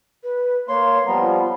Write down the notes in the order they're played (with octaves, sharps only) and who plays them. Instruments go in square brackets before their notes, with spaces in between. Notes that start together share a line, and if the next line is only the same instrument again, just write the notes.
[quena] B4
[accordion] A#3 C6 [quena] C#5
[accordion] F3 G3 B3 [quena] A#5
[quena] F4